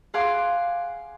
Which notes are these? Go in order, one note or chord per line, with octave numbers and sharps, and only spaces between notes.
G#4 F5 F#5 C6 D6